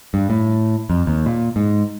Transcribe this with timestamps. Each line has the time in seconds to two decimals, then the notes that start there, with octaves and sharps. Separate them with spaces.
0.14 G2
0.30 A2
0.90 F2
1.07 D#2
1.26 A#2
1.56 G#2